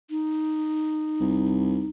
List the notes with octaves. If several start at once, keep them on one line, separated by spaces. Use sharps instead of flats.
D#4
C2